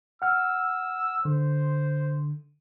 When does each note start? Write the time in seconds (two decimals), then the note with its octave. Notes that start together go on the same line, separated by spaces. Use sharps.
0.22 F#5 E6 F6
1.25 D3 C5